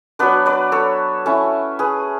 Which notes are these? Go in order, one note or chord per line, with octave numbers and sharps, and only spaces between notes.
F#3 B3 D4 B4 D5
B4 D5
A4 C#5
A3 C#4 E4
G#4 B4